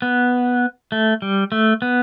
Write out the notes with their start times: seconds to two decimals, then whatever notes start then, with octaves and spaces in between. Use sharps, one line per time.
0.02 B3
0.92 A3
1.22 G3
1.52 A3
1.82 B3